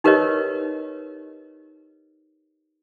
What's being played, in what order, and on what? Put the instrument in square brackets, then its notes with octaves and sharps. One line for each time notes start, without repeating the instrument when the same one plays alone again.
[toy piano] D#4 G4 A#4 B4 C#5 D#5